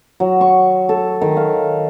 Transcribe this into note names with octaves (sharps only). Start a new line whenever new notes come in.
F#3
C#6
A4
D#3
F5